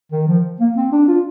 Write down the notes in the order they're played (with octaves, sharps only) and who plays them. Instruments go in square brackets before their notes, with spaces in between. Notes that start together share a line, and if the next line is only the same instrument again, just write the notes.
[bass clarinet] D#3
F3
A#3
C4
D4
F4